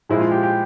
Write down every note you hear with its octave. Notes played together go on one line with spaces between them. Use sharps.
A#2 F3 G#3 E4
F4
G4
G4